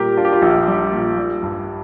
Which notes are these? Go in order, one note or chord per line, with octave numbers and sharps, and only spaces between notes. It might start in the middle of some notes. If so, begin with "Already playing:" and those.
Already playing: A#2 G3 G4 A#4
D4 F4
G4
F4
A#1
G3
A#2
G3
G2